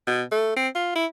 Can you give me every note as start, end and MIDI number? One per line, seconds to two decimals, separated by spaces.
0.07 0.22 47
0.31 0.55 57
0.56 0.68 60
0.75 0.91 65
0.95 1.05 64